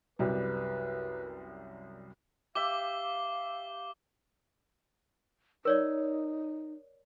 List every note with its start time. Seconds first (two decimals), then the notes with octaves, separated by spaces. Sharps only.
0.19 C2 F#2 G3 B4
2.55 G4 E5 F5 D6 G7
5.65 D#4 A#4 C#5 D5